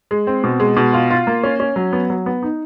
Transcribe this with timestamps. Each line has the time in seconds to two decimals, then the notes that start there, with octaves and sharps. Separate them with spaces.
0.11 G#3
0.27 C4
0.44 B2
0.60 G#3
0.77 B2
0.93 F4
1.10 F4
1.27 A#3
1.43 C#4
1.60 C#4
1.76 F#3
1.93 B3
2.10 F#3
2.26 B3
2.43 D#4